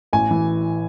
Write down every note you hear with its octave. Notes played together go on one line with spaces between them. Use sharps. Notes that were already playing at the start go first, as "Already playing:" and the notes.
A1 G#5
E3